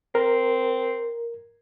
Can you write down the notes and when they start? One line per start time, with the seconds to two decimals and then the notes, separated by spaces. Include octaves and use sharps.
0.15 C4 A#4